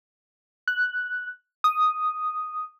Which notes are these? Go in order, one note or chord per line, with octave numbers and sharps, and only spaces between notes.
F#6
D#6